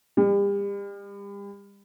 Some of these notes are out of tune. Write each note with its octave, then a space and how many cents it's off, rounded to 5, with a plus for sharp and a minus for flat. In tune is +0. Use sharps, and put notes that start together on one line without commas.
G3 +40